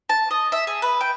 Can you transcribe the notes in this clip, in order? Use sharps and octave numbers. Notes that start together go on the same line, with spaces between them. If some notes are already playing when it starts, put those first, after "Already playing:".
A5
D#5
E5
G#4
B4
G5